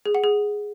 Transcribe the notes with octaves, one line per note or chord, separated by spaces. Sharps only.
G#4
F#5
G#4